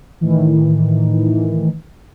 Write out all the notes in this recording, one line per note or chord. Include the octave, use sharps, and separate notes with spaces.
A2 D#3 E3